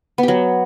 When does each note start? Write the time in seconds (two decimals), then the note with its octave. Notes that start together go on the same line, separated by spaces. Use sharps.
0.18 B3
0.23 G4
0.28 F#3